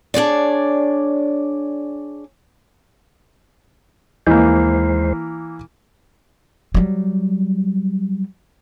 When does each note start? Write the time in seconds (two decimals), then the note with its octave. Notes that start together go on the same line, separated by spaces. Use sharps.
0.14 D4 G#4 C#5 D5
4.27 D#2 E3 G#3 A#3 C5
6.75 F#3 G3